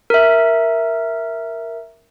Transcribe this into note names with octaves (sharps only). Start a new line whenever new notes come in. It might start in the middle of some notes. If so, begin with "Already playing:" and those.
A#4 E5